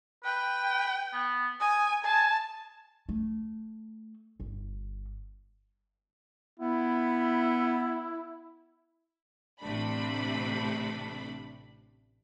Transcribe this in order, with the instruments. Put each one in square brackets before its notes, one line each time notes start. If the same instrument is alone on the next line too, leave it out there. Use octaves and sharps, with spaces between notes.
[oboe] B4 [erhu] G5
[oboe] B3
[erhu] G#5 [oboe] D#6
[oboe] G#5 [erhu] A5
[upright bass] A3
G1
[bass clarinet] B3 [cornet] E4
[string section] A1 C3 A3 D4 B5